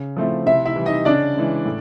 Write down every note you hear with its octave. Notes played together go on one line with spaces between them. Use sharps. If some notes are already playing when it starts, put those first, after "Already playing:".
Already playing: C#3
F3 A3 C4 E4
C3 E4 E5
E4 E5
E3 G3
D#4 D#5
C#3 D4 D5
E3 G#3 C#4
A2